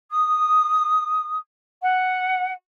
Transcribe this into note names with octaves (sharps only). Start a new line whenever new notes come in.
D#6
F#5